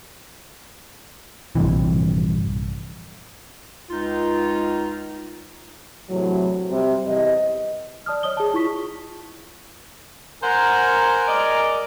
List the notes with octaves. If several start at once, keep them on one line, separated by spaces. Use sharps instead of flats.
A#1 G2 C3 E3
C#2 D#4 F4
E2 A2 C3 F#3
C3 G3
E2 C3 D#5
D5 A5 D#6 F6
C#5 D#5 D#6 G7
G#4 A5
E4 F4 C#6 B6
A#4 C5 F#5 G#5 A#5
G#3 D5 D#5